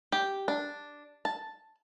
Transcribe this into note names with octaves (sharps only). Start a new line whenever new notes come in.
G4
D4
A5